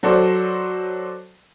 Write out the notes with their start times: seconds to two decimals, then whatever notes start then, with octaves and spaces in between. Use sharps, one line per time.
0.03 F#3 F#4 A4 C5 D5